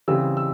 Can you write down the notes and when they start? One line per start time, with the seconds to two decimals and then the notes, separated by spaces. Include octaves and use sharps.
0.08 C#3 E3 G3 C4 E6
0.37 E6